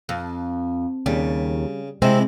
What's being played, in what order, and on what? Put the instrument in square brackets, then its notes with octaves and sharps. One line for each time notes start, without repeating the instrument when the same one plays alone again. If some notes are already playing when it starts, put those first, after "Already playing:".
[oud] F2
[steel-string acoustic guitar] D#2 [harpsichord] C#3 [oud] G3
[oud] C3 [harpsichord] G#3 E4 [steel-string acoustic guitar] C4